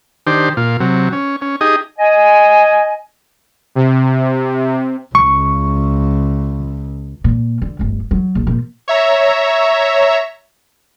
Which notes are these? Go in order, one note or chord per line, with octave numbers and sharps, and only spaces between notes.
D#3 D4 G4 C5
A#2 F4
C3 F#3
C#4
C#4
D#4 G4 G#4 D#5
D#5 G#5
C3
C#2 C#6
A#2
D3
D1 G1
F#3
A#1
A#2 F3
C#5 E5 A#5